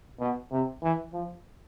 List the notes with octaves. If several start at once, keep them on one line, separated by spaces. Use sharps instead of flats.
B2
C3
E3
F3